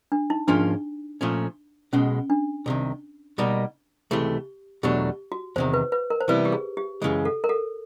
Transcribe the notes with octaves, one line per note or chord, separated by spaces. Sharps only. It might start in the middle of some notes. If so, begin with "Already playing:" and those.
D4
D#4
G#2 F3 A#3 C#4 D4 F4
A#2 F3 A3 C#4
B1 B2 G#3 C#4
D4
C2 C3 D#3
B2 G3 A#3 D#4
C#2 C3 E3 A3 G4
E2 B2 F#3 A3 D4 G4
F#4
E2 C3 D#3 C5
B4
B4
A#4
C5
C3 E3 G3 B3 E4 B4
G4
G#4
G4
F#2 C#3 E3 G#3
A4
A#4
A4